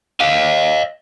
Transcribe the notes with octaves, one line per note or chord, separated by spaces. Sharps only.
D#5 F5